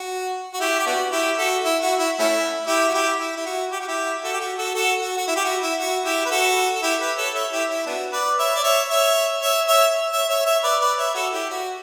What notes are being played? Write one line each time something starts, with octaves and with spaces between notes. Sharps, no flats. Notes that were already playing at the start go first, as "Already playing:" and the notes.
Already playing: F#4
F#4
E4 G4
G4
B3 D4 F#4
E4 G4
F#4 A4
E4
F#4
E4
A3 C#4 E4
E4 G4
F#4
E4 G4
E4
E4
F#4
G4
F#4
E4 G4
F#4 A4
G4
F#4
F#4 A4
F#4 A4
F#4
F#4
E4
G4
F#4
E4
F#4
E4 G4
B4
F#4 A4
A4
E4 G4
G4 B4
A4 C#5
C#5 E5
E4 G4
E4
B3 D4 F#4
B4 D5
C#5 E5
D5
C#5 E5
C#5 E5
C#5 E5
C#5 E5
C#5 E5
C#5 E5
C#5 E5
B4 D5
B4 D5
C#5 E5
F#4 A4
E4 G4
F#4